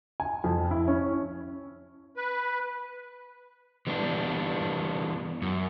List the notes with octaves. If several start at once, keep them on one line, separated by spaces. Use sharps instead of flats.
G#5
F2
E4
C#4
B4
E3 G3 B3 D4
F#2